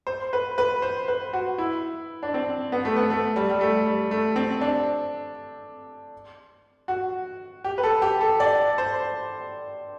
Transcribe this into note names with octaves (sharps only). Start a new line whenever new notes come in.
C5
B4
B4
C5
B4
F#4
E4
D4
C4
B3
A3
B3
A3
G3
G3
A3
G3
A3
C4
D4
F#4
G4
B4
A4
G4
A4
D5
C5